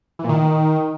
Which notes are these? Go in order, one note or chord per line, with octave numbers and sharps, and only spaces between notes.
E3
A#2
D#3